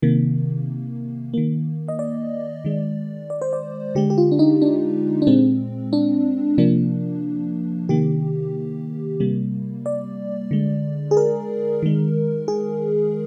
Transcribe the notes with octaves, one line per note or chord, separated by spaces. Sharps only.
C3 D#3 A#3
D#3 A#3
D#5
D5
D#3 G#3
D5
C5
D5
D3 G#3 G4
G4
F4
D4
D#4
D4
D4
A#2 G#3 C4
D4
C3 F3 A#3 D4
C3 D#3 A#3 G4
C3 G3 A#3
D5
D3 G#3
G#4
A#4
D#3 G#3
G#4